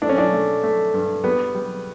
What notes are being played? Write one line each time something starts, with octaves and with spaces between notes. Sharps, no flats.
A3 D4
C#4
D4
A3
A3
G2
G3 B3
G3